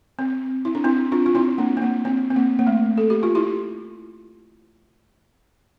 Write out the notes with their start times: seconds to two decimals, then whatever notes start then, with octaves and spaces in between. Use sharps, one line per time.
0.19 C4
0.65 E4
0.75 D4
0.84 C4 E4
1.12 D4 F4
1.26 F4
1.35 C4 E4
1.58 A#3 D4
1.77 C4
1.82 A#3
2.05 C4
2.30 C4
2.36 A#3
2.59 A#3
2.67 A3
2.98 A4
3.10 G4
3.23 F4
3.35 E4 G4